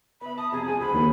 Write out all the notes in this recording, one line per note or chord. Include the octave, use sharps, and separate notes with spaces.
B3 E5 B5
A5 D#6
F2 C3 G#4 A5
F3 G#3 G#4 G#5
D2 B5
D#2